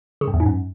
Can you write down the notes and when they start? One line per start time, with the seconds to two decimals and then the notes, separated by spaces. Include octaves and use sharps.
0.21 C#3
0.27 G2
0.34 E2
0.40 G#2
0.46 F#2